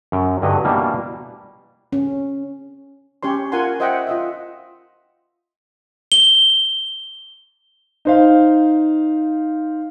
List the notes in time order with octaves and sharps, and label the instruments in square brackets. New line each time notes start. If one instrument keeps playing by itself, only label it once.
[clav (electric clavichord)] F#2
G2 D3 F#3 B4 D#5
B2 E3 G3 A#3 D4
[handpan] C#4
[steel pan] C#4 G4 C#5 C6
F4 A#4 F#5 G#5 C6
C5 D#5 E5 F#5 G5
F4 D#5 E5
[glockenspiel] G7
[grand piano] D#4 C5 F5